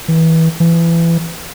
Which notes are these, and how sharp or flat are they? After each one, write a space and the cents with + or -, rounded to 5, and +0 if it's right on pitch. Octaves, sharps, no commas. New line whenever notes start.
E3 -25
E3 +25